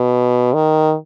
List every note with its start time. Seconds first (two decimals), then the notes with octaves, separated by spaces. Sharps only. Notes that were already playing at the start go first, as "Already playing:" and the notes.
Already playing: B2
0.54 D#3